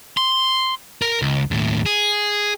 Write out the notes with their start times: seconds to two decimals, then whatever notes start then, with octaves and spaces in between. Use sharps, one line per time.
0.17 C6
1.02 A#4 A#5
1.22 C#2
1.51 D#2 A2
1.86 G#4